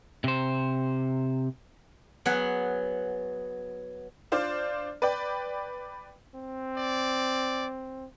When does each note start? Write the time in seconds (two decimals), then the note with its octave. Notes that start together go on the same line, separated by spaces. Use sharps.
0.24 C3 C5
2.26 F#3 B3 G#4 F#5
4.32 D4 F4 C5 D5 D6
5.02 B4 D5 G5
6.35 C4
6.78 D5